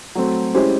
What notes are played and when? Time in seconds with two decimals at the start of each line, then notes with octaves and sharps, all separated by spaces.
0.15 F#3 A3 C4
0.54 G#3 C#4 E4 G4 C5